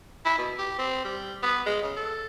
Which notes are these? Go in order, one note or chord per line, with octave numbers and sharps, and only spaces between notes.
E4
B2
G4
C4
G3
B3
G#3
C#3
A4